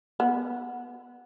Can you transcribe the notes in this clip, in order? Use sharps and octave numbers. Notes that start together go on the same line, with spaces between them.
B3